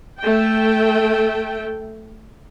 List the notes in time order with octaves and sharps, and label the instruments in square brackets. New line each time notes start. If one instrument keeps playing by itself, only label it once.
[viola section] A3 G5